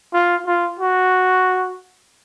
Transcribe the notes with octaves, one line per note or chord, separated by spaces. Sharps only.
F4
F4
F#4